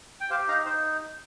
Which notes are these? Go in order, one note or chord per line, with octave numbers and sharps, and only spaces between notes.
G5
G4 C5 F5
D#4 F5 A#5
D#4 C5